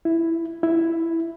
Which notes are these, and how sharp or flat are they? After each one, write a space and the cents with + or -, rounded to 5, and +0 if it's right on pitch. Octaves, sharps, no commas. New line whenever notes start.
E4 +5
E4 +5